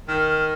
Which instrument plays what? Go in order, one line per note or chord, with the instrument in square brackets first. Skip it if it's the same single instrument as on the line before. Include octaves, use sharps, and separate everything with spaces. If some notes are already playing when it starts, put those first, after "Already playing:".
[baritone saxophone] D#3 [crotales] F6